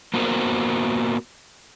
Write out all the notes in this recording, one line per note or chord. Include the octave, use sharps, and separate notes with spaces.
A#3 B3 F#4 A#4 C5